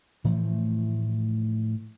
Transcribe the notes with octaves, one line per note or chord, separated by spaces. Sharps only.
A2 E3 F3 A3